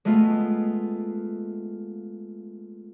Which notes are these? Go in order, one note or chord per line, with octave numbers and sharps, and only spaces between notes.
G#3 A3 B3 F4